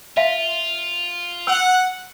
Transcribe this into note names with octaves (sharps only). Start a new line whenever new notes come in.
F4 E5 F5
F#5 E6